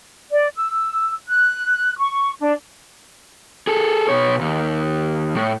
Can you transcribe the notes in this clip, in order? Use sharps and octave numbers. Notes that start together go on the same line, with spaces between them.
D5
E6
F#6
C#6
D4
G#4 A4
B2 C#5
D#2
A2